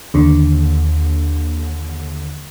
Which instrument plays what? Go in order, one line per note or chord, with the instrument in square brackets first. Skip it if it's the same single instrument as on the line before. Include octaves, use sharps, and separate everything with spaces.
[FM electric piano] D#2 D3